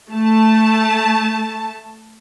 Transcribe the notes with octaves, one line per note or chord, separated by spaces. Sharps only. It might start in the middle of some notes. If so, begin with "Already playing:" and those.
A3 A5